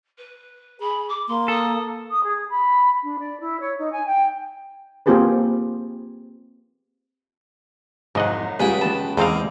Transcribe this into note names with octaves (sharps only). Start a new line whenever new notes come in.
B4
G#4 B5
D6
A#3 C6
A4 D#6
D#6
G#4
B5
D4
D5
E4
C#5
D#4
G#5
G5
A#3 C4 F4 G4 G#4 B4
C2 F2 G#2 F#3 D#5 F#5
C#2 G3 B3 F4 F#4 G5 G#5
F2 B4 A5
E2 E3 G#3 A#3 C4 F5